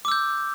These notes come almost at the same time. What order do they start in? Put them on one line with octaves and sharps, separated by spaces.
D6 E6 G6